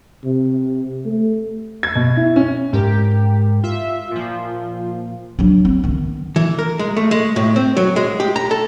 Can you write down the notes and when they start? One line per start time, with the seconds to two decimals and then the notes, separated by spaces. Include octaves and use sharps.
0.25 C3
1.05 A3
1.83 G#6
1.95 B2
2.17 E4
2.36 C#4
2.73 G#2 G4 A#4
3.64 F4 E5
4.11 A#2 F3
5.39 F#3 D4
5.65 C4
5.84 D#3 B3
6.36 E3
6.59 A#4
6.79 G#3
6.97 A3
7.11 G#3
7.36 A2
7.56 C4
7.77 F#3
7.96 G#3
8.20 G4
8.36 A#5
8.51 A4